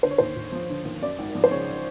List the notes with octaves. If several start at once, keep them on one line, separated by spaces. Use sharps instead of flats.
D3 C5
C#5
D#2 C5
D#2
F3
D3
D#2
F#2 D5
G#1
F3
C5
C#3 C#5